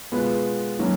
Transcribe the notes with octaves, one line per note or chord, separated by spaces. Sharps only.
B2 G#3 B3 F4 B4
D#3 F#3 A#3 C#4